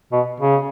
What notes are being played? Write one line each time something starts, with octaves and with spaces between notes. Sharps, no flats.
B2
C#3